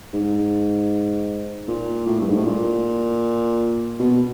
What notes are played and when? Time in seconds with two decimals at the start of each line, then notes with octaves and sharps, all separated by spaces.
0.14 G#2
1.68 A#2
2.06 A2
2.21 G2
2.28 G#2
2.37 A2
2.45 A#2
3.99 B2